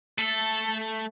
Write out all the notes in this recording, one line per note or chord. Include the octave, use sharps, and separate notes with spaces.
A3 A4